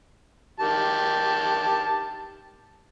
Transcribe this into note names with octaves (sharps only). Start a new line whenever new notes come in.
D#3 G4 A5